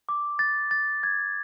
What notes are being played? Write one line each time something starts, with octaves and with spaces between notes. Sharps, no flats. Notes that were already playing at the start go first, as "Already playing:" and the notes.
D6
A6
A6
G#6